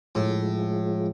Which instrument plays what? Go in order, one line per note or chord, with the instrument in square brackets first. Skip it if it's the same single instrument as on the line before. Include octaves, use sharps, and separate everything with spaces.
[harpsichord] A2 [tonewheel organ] F3 G#3